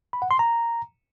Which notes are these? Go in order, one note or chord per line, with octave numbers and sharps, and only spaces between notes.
B5
F#5
C6
A#5